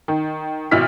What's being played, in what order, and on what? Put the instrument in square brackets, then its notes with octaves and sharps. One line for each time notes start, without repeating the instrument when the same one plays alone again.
[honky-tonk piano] D#3
G#1 B2 E4 F6 B6